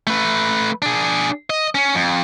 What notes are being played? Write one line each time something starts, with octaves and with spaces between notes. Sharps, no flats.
A3 B4
D4 G#4
D#5
C#4
F2